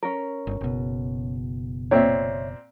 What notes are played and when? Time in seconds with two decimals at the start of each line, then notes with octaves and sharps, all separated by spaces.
0.03 C#4 A#4
0.47 G1
0.61 F#1 B2
1.91 A#2 C4 C#5 E5